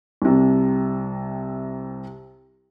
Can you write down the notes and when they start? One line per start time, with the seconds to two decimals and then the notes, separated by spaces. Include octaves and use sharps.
0.22 C2 C3